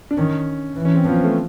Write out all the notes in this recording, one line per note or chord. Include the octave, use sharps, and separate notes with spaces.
D4
D#3 C#4
E3
C#4
C4
F3 B3
A3